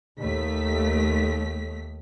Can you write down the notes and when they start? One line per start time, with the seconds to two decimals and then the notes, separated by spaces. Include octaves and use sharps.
0.18 D#2 A3 B6